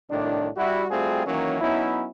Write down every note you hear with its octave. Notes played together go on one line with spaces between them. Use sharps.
C2 A2 D#3 D4
G3 E4 F#4
G3 A3 C4 F4 F#4 G#4
D#3 E3 F#3 A#3 C#4
F#3 B3 C#4 D#4 E4